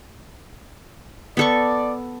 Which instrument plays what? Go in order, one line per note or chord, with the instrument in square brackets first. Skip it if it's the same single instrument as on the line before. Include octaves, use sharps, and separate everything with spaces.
[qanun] B3 A4 C#6 [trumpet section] D5